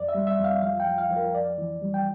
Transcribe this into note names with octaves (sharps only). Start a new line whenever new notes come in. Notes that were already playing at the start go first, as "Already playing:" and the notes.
Already playing: F2 D5
E5
G3
E5
F2
F5
F3 F5
G5
F3
F5
F3
A#4
F2 D5
E3
G3
G5